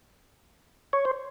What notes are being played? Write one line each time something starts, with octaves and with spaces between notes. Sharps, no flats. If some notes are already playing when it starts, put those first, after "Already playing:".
C#5
C5